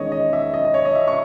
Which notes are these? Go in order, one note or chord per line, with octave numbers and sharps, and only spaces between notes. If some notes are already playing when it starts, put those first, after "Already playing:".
Already playing: E2 D#3 G#3 C#4 C#5 D#5
D#5
E5
D#5
D#5
C#5
D#5
E5
C#6